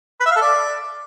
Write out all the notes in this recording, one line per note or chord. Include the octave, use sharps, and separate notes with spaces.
B4
E5
F5
A4
D5